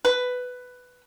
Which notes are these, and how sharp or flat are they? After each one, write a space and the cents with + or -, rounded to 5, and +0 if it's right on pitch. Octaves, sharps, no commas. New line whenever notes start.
B4 +10